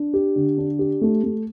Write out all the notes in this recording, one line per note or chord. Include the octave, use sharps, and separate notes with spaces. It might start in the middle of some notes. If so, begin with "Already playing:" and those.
Already playing: D4
G4
D3
D4
G4
A3
A3